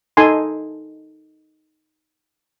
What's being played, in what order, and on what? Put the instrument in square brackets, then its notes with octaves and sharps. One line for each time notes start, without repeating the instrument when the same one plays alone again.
[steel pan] D#4 A4 G#5 C6